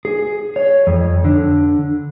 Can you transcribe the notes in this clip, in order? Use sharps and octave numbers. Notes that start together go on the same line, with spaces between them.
G#4
C#5
F2
D3